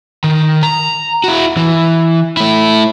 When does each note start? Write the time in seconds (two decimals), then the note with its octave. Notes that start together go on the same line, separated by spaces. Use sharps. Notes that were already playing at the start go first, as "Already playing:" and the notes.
0.24 D#3
0.63 A#5
1.24 E4 F#4
1.57 E3
2.37 A3 E4